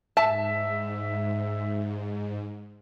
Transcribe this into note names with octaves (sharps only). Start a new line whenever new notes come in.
G#2 E5 A5